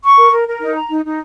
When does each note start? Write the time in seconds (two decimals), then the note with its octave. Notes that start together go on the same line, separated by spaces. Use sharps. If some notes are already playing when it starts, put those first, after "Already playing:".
0.04 C#6
0.18 A#4
0.32 A#4
0.47 A#4
0.61 D#4
0.75 A#5
0.90 D#4
1.04 D#4